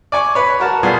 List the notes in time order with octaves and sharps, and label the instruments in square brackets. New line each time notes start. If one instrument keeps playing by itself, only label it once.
[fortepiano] D5 G#5 C#6
B4 C#5
F#4 A#4 A5
B2 G3 B3 F4 G#4